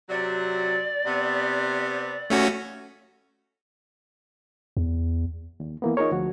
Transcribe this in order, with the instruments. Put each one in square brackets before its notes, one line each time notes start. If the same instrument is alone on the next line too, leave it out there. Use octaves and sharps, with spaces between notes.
[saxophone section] C3 F#3 [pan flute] D5
[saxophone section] C3 B3
[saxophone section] D#2 [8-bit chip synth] A3 C#4 F#4
[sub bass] E2
[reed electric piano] D#2
E3 A#3 B3
D#4 F4 G#4 A#4 C#5
D2 F3 F#4